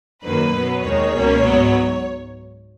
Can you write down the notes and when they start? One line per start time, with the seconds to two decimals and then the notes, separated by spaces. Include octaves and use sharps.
0.23 F#2 D#3 F#3 A#3 B4
0.53 B2 F#3 B3
0.82 D#2 D#3 G#3 C#5
1.12 C#2 B2 A#3 C#4
1.42 G#2 F#3 B3